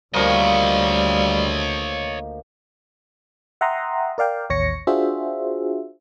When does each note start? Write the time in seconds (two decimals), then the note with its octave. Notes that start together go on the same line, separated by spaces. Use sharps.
0.14 D2 D#3 F3 G3 A#3 C#5 D#5
3.61 E5 F#5 G5 A#5 C6 D#6
4.18 A#4 D5 F5 G5
4.50 A1 D#2 C#5 A#6 C#7
4.87 D4 F4 F#4 G#4 C5 E5